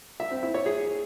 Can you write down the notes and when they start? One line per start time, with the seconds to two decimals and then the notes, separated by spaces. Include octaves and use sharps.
0.20 E5
0.31 C4
0.43 E4
0.54 C#5
0.66 G#4